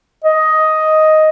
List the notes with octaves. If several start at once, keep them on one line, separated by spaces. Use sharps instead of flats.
D#5